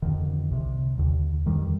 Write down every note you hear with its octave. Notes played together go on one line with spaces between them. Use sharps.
F2 D3 D#3
C2 C3
D#2 D3
F2 D3 D#3 G3